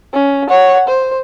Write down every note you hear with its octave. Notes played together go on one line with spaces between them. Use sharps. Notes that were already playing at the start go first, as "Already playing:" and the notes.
C#4
C#5 F#5
C5